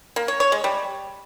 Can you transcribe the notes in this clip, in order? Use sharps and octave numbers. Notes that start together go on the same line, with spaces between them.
A#3
C#5
C#5
G#3
G3